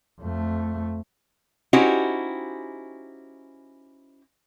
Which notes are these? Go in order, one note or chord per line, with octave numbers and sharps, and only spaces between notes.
F2 A3
C#4 D#4 E4 F#4 G4 C5